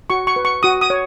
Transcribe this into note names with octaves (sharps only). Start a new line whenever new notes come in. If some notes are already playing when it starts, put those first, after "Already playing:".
F#4 C#6
C#6
B4
C#6
F#4 D#6
D#6
C#5